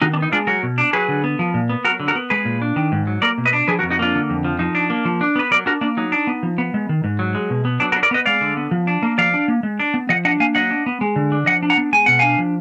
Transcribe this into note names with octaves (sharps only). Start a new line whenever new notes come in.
D#3 D#4 F#4
D4
B3
D#4
G#3 D4 F4
F#3 F#4 A#4
B2
D4
F#3 G#4 B4
D3
B3
F3
A#2
B3
F#3 F#4 A#4
D3
F#4 A#4
B3
G#3 G#4 B4
A#2
D4
D#3
G#2
F#3
A#3 A#4 D5
B2
B4 D#5
D4
F3 G#4 B4
F#4 A#4
F2
D#4 F#4
A#3 D4 F4
D3
F2
F3
F3 D#4
D4
A#3
F3
D4
B3 B4
F#3 A#4 D5
D4 F#4 A#4
A#3 D4
F#3 D#4
D4
B3
F3
B3
G#3
D#3
G#2
F#3
G#3
B2
B3
F#3 D4
F#4 A#4
D4
A#4 D5
B3 B4 D#5
G#3 D5 F5
D3
B3
F3
D4
A#3
F3 D5 F5
D4
A#3
G#3
D4
B3
F3 D#5 F#5
D4 D#5 F#5
A#3 F5 G#5
F#3 D#5 F#5
D4
B3
G#3
D3
D4
F3 D#5 F#5
D4
F#5 A#5
B3
G#3 G#5
B2 F#5
D4 F5 G#5
F3